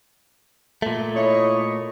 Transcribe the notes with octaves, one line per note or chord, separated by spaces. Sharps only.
A#2 A3
E4 C#5 D#5